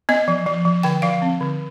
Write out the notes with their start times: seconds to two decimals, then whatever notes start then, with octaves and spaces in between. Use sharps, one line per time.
0.09 B3 D#5
0.28 F3
0.46 F3
0.65 F3
0.83 D3 G5
1.02 F3 F5
1.22 C4
1.40 D3